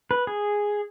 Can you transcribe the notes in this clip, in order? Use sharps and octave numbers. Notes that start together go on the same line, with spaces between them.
B4
G#4